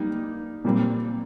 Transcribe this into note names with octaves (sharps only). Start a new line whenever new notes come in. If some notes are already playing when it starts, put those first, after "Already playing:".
Already playing: G3 A#3 D#4
A#2 G3 C4